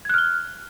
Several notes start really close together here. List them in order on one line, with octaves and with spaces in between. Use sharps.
G#6 F#6 F6 G7